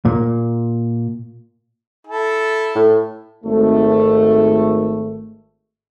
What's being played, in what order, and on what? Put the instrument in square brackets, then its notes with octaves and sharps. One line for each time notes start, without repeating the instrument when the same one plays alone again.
[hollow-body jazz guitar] A#2
[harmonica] E4 A4
[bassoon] A2
[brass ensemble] G#1 A3